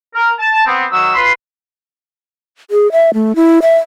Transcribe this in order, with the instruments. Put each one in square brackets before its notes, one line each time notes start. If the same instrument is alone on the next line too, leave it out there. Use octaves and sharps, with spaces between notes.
[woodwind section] A#4
A5
B3 C4
D#3 F#3 E6
F4 B4 B5 C6
[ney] G#4
E5
A3
E4
E5